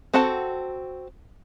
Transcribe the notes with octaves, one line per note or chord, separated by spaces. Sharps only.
C4 F#4 A4 F#5 A5